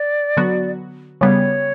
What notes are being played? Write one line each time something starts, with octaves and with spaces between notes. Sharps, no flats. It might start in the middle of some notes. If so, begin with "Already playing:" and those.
Already playing: D5
D3 F#3 B3 F#4
C#3 G3 B3 C#5